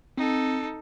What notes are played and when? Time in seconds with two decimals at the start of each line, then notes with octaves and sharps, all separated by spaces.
0.17 C4 D#4 A4